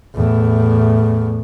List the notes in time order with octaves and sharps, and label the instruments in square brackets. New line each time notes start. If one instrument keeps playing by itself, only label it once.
[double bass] E2 A2